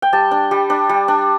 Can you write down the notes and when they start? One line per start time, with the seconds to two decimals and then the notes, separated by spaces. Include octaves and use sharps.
0.02 G5
0.13 G3 A5
0.31 D4
0.51 G3
0.70 D4
0.89 G3
1.08 D4